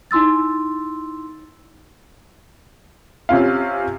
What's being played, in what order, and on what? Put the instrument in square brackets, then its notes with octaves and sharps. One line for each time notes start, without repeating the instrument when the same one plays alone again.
[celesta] D#4 E4 C6 E6 A6
[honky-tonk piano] C3 C#4 F4 F5